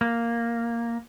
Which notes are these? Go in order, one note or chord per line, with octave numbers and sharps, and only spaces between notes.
A#3